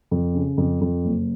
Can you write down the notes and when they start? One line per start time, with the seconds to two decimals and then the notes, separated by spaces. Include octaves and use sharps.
0.11 F2
0.35 C#3
0.58 F2
0.81 F2
1.05 F#1